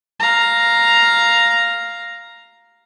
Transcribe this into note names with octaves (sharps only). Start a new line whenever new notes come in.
F5 A#5